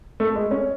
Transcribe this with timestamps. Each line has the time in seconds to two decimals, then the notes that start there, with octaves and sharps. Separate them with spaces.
0.20 A3
0.36 G#3
0.51 C#4